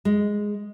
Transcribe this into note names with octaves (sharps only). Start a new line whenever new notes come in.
G#3